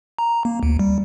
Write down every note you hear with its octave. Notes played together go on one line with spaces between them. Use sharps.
A#5
A#3
D2
G3